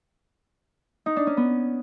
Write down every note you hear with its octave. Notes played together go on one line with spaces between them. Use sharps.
D#4
D4
C#4
B3